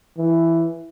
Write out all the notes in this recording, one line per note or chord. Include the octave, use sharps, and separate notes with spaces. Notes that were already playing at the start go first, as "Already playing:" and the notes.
E3